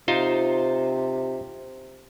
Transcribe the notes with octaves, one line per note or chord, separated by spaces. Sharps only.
C3 D#4 F4 C5